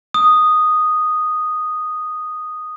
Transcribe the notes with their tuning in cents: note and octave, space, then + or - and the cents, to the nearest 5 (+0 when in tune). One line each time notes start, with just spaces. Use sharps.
D#6 -5